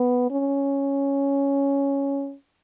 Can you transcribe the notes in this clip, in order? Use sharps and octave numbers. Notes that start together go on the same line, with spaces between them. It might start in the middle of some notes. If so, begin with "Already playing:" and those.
Already playing: B3
C#4